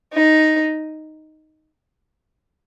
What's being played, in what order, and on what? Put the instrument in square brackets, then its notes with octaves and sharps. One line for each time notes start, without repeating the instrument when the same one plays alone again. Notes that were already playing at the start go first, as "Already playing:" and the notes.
[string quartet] D#4